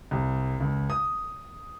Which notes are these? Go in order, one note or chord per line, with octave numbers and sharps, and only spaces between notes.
C2
C#2
D#6